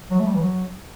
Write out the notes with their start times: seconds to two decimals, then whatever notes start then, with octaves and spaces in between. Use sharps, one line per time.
0.11 F#3
0.20 A3
0.26 G3
0.35 E3
0.41 F#3